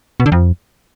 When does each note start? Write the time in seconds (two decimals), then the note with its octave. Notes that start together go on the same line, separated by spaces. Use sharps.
0.20 B2
0.26 D3
0.32 F2